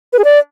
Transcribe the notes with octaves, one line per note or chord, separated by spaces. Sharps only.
B4
G#4
D5